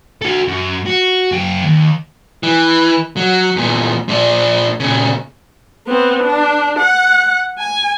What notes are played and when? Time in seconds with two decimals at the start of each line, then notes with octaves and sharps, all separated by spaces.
0.22 F#4 A4
0.48 F#2
0.86 F#4
1.32 F#2 G5
1.64 D#2
2.43 E3
3.17 F#3
3.56 E2 A#2
4.08 A#2 D4
4.80 A#2 C#3
5.87 B3 C4
6.23 D4
6.79 F#5
7.59 G#5